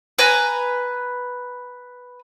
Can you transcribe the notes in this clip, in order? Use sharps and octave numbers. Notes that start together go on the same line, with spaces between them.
B4 G#5 A#5